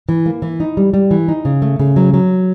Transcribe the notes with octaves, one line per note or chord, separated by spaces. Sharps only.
E3
A#3
E3
D#4
G3
G3
E3
D#4
C#3
A3
C#3
F#3
F#3